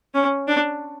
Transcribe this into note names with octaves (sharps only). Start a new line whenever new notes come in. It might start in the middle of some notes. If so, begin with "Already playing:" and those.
C#4
D4